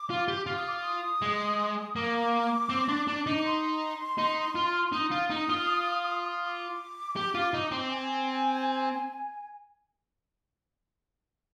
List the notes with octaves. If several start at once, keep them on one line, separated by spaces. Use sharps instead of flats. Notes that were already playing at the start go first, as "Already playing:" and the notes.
Already playing: D6
F4
G4
F4
D#6
D6
D#6
G#3
A#3 D6
C4
D4
D4
D#4
D6
C6
D#4
F4
D#4 D#6
F4
D#4
F4
D6
G4
F4
D#4
C4
G#5